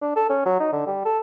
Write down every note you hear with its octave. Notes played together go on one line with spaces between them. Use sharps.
D4
A4
C#4
F#3
D#4
D3
G3
A4